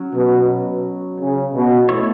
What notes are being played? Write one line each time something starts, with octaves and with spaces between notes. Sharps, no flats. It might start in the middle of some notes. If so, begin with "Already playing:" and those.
Already playing: F#3 C#4 F#4
B2
C#3
B2
A3 E4 C#5